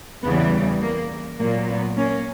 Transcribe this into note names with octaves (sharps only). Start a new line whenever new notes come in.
E2 C#3 E3 G3 B3
A#3
A#2 F#3 A#3
B3
A#3 C#4